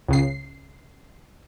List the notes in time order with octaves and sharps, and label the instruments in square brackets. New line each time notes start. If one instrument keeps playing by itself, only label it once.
[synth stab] C#2 C#3 C7